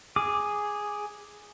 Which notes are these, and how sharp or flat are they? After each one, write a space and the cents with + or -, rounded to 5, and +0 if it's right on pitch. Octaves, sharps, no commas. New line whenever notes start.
G#4 -5 D6 +5